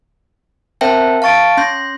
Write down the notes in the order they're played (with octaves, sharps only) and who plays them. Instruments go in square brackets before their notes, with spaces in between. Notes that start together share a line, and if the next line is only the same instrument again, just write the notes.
[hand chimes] C4 A#4 C5 E5 G5 A5
F5 A5 C#6 A6 D7
C#4 C6 G6 A#6